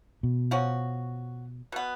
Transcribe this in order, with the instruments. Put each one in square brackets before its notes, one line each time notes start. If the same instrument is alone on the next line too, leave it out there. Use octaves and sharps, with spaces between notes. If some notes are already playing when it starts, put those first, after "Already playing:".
[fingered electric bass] B2
[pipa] F3 C#4 F#4
B2 B3